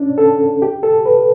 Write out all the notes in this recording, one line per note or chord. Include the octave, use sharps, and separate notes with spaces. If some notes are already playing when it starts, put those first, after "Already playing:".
Already playing: C#4 D4
A4
G4
A4
B4